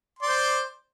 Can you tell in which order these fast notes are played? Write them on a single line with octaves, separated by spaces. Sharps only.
C6 D5 C5